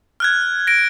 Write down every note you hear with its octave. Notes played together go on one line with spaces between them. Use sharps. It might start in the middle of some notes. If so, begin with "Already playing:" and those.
F6 F#6 G#6
A#6 D7